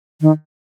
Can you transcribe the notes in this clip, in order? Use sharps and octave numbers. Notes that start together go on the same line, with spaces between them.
D#3